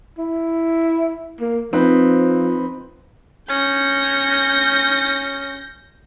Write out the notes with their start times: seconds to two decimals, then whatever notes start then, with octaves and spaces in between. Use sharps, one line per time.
0.18 E4
1.41 A#3
1.73 F3 C4 D#4 B4
3.50 C#4 G6 A#6